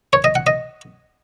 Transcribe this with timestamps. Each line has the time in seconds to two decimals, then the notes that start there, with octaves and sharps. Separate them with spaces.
0.13 C#5
0.24 D#5
0.35 F#5
0.47 D#5